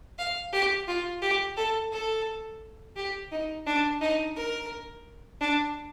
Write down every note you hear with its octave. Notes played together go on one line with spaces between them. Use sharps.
F5
G4
F4
G4
A4
A4
G4
D#4
D4
D#4
A#4
D4